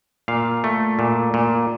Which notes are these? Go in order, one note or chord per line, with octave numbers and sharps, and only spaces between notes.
A#2 F5
A3
A#2
A#2